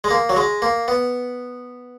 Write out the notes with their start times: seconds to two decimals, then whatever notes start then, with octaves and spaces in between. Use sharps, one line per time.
0.04 G#3
0.11 A#3
0.29 F#3
0.37 G#3
0.62 A#3
0.88 B3